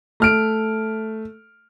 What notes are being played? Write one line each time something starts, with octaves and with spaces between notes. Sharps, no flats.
A3 F6 D7